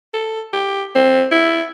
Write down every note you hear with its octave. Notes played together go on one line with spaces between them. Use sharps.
A4
G4
C4
E4